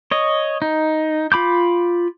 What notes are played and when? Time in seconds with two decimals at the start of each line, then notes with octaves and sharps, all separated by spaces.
0.11 C#5 D#5
0.62 D#4
1.32 F4 B5 D6 G6